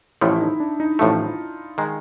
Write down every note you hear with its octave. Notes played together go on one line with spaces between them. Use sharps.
A1 A2 F3 A3 E4
D#4
D4
D#4
A1 A2 F3 A3 F4
D#3 G#3